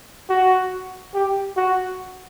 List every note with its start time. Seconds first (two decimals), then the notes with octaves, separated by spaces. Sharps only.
0.29 F#4
1.14 G4
1.57 F#4